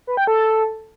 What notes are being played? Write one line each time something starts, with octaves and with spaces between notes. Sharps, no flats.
B4
G5
A4